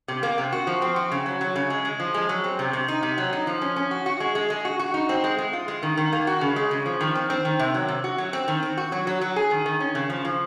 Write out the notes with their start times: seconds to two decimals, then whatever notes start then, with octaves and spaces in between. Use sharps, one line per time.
0.08 C3
0.23 A#3
0.38 C3
0.52 F#4
0.67 F3
0.82 C4
0.96 F#4
1.12 C#3
1.26 F#3
1.41 F#3
1.56 C#3
1.70 G#3
1.85 G#3
2.00 F3
2.14 G#3
2.29 F#3
2.44 C4
2.59 C3
2.73 C3
2.88 D#4
3.03 C3
3.18 F#3
3.33 D#4
3.47 F3
3.62 C#4
3.76 C#4
3.91 F#4
4.06 F#4
4.20 G#3
4.35 G#3
4.50 G#3
4.65 F#4
4.79 F#4
4.94 D#4
5.09 C4
5.24 G#3
5.38 G#3
5.53 F4
5.68 G#3
5.83 D#3
5.97 D#3
6.12 A#3
6.27 F#4
6.41 C#3
6.56 G#3
6.71 C#3
6.86 F3
7.01 D#3
7.15 C4
7.30 C4
7.45 D#3
7.59 C3
7.74 F#3
7.88 C3
8.04 F#4
8.18 F#3
8.33 C4
8.48 D#3
8.63 C4
8.77 F#4
8.92 F#3
9.07 F#3
9.21 F#3
9.36 G#4
9.51 D#3
9.66 D#3
9.80 C#4
9.95 C#3
10.10 F3
10.25 F3